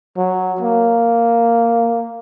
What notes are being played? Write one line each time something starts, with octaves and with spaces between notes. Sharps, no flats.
F#3
A#3